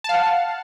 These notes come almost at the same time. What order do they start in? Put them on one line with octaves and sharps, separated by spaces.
A5 F5 F#5